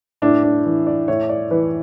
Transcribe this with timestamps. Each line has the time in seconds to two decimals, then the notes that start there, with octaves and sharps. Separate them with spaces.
0.22 A2 D4
0.43 D4
0.65 E3
0.87 D5
1.08 A2 C#5
1.29 D5
1.51 E3 B4